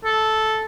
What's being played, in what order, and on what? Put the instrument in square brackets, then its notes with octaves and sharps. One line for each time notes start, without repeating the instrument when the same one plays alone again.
[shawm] A4